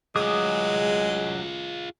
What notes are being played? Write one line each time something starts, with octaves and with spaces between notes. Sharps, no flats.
F#3 G#3 F4 G#4 D6 D#6